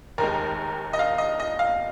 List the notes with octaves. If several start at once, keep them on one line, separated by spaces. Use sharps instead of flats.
F1 D#2 D#3 G#3 A#4
D#5
F5
D#5
D#5
F5